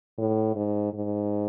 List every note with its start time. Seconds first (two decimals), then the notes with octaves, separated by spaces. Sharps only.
0.18 A2
0.56 G#2
0.93 G#2